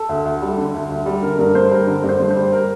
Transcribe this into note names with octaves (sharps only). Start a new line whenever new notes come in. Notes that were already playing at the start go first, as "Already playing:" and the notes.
Already playing: A4
D2
D2
G3
D3
D2
D2
G3
D3 A#4
G2 A#4
G2 C5
G3 A#4
D3 A#4
G2
C5
G2
C5
G3
G3 A#4